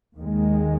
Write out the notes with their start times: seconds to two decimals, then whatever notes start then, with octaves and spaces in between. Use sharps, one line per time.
0.16 D#2 D#3 G#3